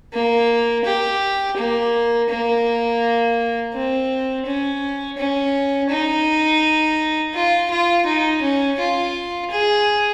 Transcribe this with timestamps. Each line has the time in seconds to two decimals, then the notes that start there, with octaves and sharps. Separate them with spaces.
0.13 A#3
0.85 G4
1.57 A#3
2.29 A#3
3.74 C4
4.46 C#4
5.18 C#4
5.90 D#4
7.34 F4
7.71 F4
8.06 D#4
8.42 C#4
8.79 F4
9.51 G#4